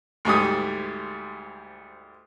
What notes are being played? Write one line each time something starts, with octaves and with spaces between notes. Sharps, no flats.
D2 G#2 G3 D#6